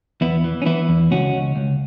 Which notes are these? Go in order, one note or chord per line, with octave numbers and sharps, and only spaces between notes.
E2 B3 E4
E3
C#4
E3 B3 E4
E2
C#2 C#4 F#4
C#2
C#2